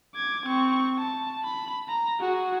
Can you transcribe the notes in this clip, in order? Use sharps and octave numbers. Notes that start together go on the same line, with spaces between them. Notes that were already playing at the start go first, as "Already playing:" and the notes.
D6 G#6
C4 C#6
A5
B5
A#5
F#4 G#4